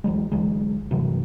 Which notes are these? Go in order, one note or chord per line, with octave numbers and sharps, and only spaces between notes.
D1 E3 F#3 G#3
D2 E3 F#3 G#3
G2 C3 E3 F#3